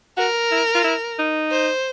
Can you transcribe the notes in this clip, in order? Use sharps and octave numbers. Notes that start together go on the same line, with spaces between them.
F#4 A#4
E4
F4
E4
D#4
C5